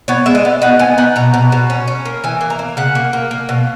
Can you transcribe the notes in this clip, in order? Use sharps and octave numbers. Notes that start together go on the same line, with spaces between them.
B3 C#5
G#3 E5
D#5
B3
D#4 F#5
B3 G#5
D#4 F#5
B2 A#5
B2
B2
C#4
C#4
A#3
E3 G#5
A#3
A#5
A#3
C#3 F#5
A#3
A#3
A#3
B2